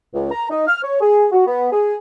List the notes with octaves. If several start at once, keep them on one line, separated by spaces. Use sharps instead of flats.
C#2
A#5
D#4
F6
C#5
G#4
F#4
B3
G#4